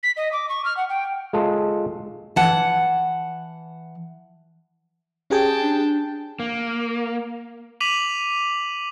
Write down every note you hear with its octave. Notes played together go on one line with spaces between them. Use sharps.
B6
D#5
D6
C#6
F6
F#5
G5
G#3 F4 A4
E3 F#5 A5
C#4 G4 G#4 G5 A5
D4
A#3
D6 B6 D#7 F7 F#7